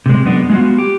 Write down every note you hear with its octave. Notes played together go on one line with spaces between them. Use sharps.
C3 G#3
F#2 G#3 B3 D4
G#3 B3 D#4 F4 F#4
G4